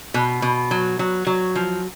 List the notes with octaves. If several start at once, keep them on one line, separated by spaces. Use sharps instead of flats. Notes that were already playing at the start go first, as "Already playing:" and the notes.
B2
B2
F#3
F#3
F#3
F3